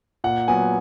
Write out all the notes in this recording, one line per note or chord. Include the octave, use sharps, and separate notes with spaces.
A#2 F#5
F#3 B3 G#5